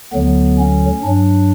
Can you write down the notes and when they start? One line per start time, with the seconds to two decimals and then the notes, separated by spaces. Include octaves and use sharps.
0.12 D2 D3 F#3 B3
0.58 C#4
1.03 G2 F#3 D4